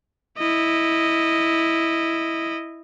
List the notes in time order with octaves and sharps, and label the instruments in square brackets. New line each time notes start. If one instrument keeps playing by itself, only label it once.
[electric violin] E4 D#5